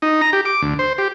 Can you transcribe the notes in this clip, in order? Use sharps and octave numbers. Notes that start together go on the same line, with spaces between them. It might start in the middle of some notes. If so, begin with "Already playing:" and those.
D#4
A#5
G4
D6
D2
C5
G4